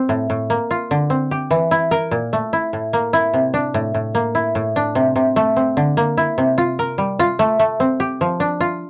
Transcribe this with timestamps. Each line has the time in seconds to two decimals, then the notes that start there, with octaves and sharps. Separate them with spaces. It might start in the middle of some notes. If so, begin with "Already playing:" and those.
Already playing: C4
0.09 A2
0.30 A2
0.50 A#3
0.71 F4
0.91 D3
1.10 C4
1.31 G4
1.51 E3
1.71 E4
1.91 A#4
2.11 A#2
2.33 A3
2.53 E4
2.73 A2
2.93 A#3
3.13 E4
3.34 C3
3.54 D4
3.74 A2
3.94 A2
4.15 A#3
4.35 E4
4.55 A2
4.76 D4
4.95 C3
5.16 C3
5.36 A3
5.56 C4
5.77 D3
5.97 A#3
6.17 E4
6.38 C3
6.58 F4
6.79 A#4
6.98 G3
7.19 F4
7.39 A3
7.59 A3
7.80 C4
8.00 G4
8.21 F3
8.40 D4
8.61 F4